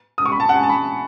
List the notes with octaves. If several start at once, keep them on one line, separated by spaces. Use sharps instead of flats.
D#6
C#6
B5
A5
F#5
G#5
A5
B5